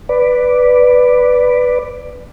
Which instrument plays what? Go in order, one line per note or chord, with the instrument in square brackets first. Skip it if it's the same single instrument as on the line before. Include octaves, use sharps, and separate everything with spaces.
[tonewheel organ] B4 D5